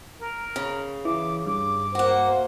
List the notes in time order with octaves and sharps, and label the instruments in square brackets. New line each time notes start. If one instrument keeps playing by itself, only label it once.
[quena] A#4
[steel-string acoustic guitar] C#3
[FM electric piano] E3 [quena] D6
[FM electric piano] G2 [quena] D6
[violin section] A#3 C5 [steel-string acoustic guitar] F#4 F#5